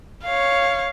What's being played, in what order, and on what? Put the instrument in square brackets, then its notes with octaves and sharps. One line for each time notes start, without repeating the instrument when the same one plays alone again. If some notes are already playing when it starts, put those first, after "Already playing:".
[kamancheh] C#5 F5